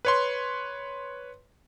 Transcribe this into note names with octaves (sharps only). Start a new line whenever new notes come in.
B4 C#5 C6